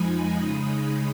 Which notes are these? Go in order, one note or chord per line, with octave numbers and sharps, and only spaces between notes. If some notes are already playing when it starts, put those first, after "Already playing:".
Already playing: F2 F3 G#3 D#4 G#5 B5
C#3 G#3 D#4 B5 D#6